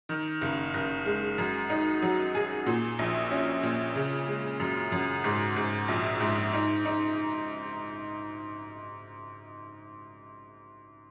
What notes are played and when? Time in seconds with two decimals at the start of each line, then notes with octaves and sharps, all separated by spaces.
0.09 D#3
0.41 F#1
0.74 F#1
1.06 G#3
1.38 F#2
1.70 D#4
2.02 F#3
2.35 G#4
2.66 A#2
2.99 A#1
3.31 C#4
3.63 A#2
3.96 C#3
4.28 G#3
4.60 F#2
4.92 F#2
5.24 G#2
5.56 G#2
5.88 A#1
6.21 G#2
6.53 D#4
6.85 D#4